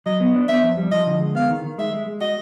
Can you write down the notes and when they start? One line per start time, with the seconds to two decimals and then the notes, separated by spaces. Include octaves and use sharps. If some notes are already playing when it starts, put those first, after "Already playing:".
0.06 F#3 D#5
0.20 B3
0.35 D4
0.48 B3 E5
0.63 F2
0.77 G3
0.91 F3 D#5
1.07 D3
1.21 G#3
1.35 B3 F5
1.50 D#3
1.64 D#3
1.78 G#3 E5
1.93 G#3
2.06 G#3
2.21 F#4 D#5